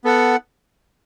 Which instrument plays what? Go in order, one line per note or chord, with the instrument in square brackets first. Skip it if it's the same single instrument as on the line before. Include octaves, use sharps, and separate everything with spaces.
[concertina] B3 A4 F#5